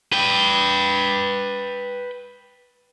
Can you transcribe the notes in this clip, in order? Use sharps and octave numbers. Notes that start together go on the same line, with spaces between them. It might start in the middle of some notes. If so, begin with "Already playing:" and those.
B4 G5